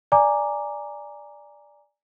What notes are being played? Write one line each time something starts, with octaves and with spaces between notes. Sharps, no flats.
D5 G#5 A#5 D6